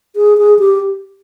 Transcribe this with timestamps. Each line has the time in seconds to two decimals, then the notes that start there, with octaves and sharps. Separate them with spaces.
0.16 G#4
0.38 G#4
0.59 G4